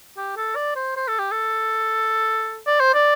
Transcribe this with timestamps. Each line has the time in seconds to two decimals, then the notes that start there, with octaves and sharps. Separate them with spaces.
0.17 G4
0.37 A4
0.56 D5
0.76 C5
0.96 C5
1.08 A4
1.19 G4
1.31 A4
2.67 D5
2.80 C5
2.94 D5